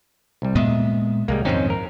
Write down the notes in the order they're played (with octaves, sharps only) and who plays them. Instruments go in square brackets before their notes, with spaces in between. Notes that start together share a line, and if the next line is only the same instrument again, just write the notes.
[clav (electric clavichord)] C2 G3
[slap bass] A#2 G#3 B3 [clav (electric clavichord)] D#5 E5
[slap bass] C2 [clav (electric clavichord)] G3 G#3 A#3
[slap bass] F2 G#2 D#3 [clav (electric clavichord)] C4 C#4 D#4
[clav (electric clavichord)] A#4